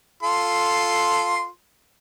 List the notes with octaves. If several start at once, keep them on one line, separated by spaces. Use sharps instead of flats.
F4 A4 C6